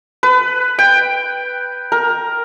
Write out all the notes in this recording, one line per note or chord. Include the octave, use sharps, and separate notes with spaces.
B4
G5
A#4